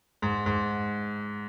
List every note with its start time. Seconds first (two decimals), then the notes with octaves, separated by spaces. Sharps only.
0.22 G#2
0.46 G#2